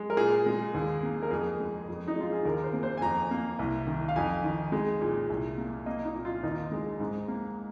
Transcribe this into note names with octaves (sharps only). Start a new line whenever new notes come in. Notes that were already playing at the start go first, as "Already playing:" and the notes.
Already playing: G#3
A#4
A#2 G#4
G#3
D#2
A#3
A#4
F2 G#4
G#3
F2
D#4
G#3 F4
G#4
D#2 A#4
C5
A#3
C5
G#5
F2 A#5
A#3
C2
D#3
F5
F2 G#5
D#3
G#3
A#2
C2
A#3
A#3 D#5
D#4
A#2
F4
D#2 D#4
G#3
G#2
A#3